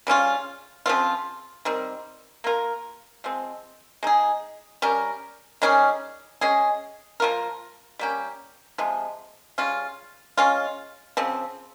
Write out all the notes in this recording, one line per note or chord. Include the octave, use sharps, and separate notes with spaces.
C#3 G3 C#4 F4
C#3 F3 C4 F4
D#3 G3 C4
A#3 F4 A#4
F3 G#3 C4
G#3 D#4 G#4
G3 C#4 G4 A#4
D#3 G3 C#4 G#4
G#3 C#4 G#4
F3 A#3 F4 A#4
G3 A#3 C#4 G4
C3 F3 G#3
C#3 G3 C#4 F4
G#3 C#4 F4
C#3 F3 C4